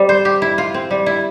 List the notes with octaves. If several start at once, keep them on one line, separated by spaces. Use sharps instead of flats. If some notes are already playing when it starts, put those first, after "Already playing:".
Already playing: G3 C4
C5
G4
E4
F4
C4
G3
E4